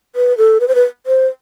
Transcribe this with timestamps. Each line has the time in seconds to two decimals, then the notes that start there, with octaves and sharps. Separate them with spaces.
0.16 B4
0.38 A4
0.60 B4
0.68 C5
0.75 B4
1.06 C5